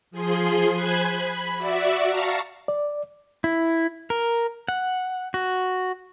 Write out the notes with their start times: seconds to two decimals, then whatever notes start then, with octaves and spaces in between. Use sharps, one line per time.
0.11 F3 G#4 C6
0.72 C5 G#5 B5 F#6 G#6
1.06 B5
1.57 F#4 D5 E5
2.08 F5 A5 A#5 C#6
2.68 D5
3.44 E4
4.10 A#4
4.68 F#5
5.34 F#4